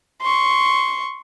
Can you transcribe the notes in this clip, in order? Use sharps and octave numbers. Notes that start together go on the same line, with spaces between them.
C6 C#6